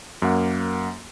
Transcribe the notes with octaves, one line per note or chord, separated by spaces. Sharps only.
F#2 A#3 F#5